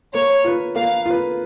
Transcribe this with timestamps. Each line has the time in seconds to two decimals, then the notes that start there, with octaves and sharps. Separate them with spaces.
0.14 A#3 C#5
0.44 F4 B4
0.76 A#3 F5
1.06 F4 B4